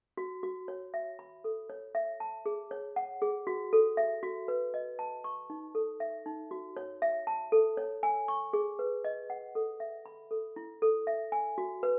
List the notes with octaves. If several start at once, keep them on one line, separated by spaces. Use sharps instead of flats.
F#4
F#4
C#5
E5
B5
A4
C#5
E5
A5
G#4
C#5
F#5
G#4
F#4
A4
E5
F#4
B4
D#5
A5
C#6
D#4
A4
E5
D#4
F#4
C#5
E5
A5
A4
C#5
G#5
C#6
G#4
B4
D#5
F#5
A4
E5
B5
A4
E4
A4
E5
G#5
F#4
B4